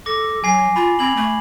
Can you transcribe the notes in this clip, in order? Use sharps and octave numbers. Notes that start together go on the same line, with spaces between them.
A4 D6 A#6
F#3 G#5 C7
F4 B5
C4 B5 G#6 F#7
A3